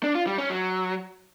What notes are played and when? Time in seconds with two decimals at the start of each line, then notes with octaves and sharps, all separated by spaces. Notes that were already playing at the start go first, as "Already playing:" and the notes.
0.03 D4
0.15 F4
0.27 G3
0.38 C#4
0.50 F#3